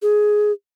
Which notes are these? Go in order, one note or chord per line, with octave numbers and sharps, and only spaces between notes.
G#4